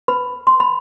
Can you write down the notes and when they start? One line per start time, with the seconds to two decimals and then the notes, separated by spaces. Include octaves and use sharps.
0.08 B4 B5
0.47 C6
0.60 B5